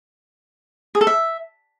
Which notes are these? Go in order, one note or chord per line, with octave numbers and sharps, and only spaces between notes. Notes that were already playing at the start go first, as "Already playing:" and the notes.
G#4
A4
E5